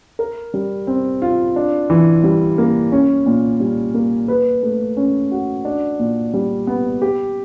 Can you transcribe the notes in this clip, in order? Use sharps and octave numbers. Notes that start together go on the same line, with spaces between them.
A#4
G3
C4
F4
D4
E3
G3
A#3
C#4
A#2
G3
A#3
B4
A3
C#4
F#4
D4
A#2
G3
B3
G4